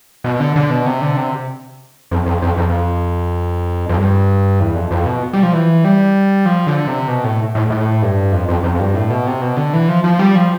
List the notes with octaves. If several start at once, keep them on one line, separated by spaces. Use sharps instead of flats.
B2
D3
D3
B2
C3
D3
C3
F2
F2
F2
F2
F2
G2
E2
F2
F2
B2
G3
F3
E3
G3
F3
D3
C3
B2
A2
A2
A2
G2
F2
F2
F2
G2
A2
B2
C3
B2
D3
E3
F3
F3
G3
F3